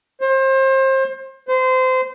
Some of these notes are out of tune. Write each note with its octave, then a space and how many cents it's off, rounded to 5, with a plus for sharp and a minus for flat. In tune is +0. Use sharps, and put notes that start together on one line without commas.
C5 +30
C5 -25